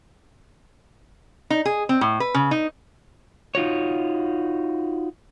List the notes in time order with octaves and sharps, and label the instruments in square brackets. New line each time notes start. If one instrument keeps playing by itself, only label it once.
[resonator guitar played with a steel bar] D#4
G#4
C4
A2
B4
C#3
D#4
[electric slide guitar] D#4 F4 F#4 C#5